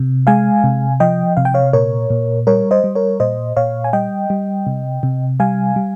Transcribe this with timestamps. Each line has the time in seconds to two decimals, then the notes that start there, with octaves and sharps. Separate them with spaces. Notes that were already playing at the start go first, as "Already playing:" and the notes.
Already playing: C3
0.27 G#3 F5 G#5
0.64 C3
1.00 F3 D#5 G5
1.37 C3 F5
1.45 G5
1.54 C#5 F5
1.73 A#2 A#4 C#5
2.10 A#2
2.47 G3 A#4 C#5
2.71 C5 D#5
2.84 G3
2.95 A#4 C#5
3.20 A#2 C5 D#5
3.57 A#2 C#5 F5
3.84 G#5
3.93 G3 D#5 G5
4.30 G3
4.67 C3
5.03 C3
5.40 G3 F5 G#5
5.76 G3